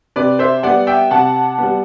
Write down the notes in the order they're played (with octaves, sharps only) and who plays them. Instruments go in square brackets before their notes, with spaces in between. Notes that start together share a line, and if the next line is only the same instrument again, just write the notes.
[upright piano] C3 B4 D5
C5 E5
G3 B3 D5 F#5
E5 G5
C3 F#5 A5
G3 B3